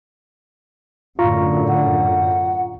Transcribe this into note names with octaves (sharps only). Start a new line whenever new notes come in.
F#2 A2 D3 F4 A#5 C#6
F#5